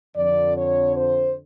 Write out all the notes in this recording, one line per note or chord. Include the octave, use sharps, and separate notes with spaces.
F2 D3 D5
C#5
C5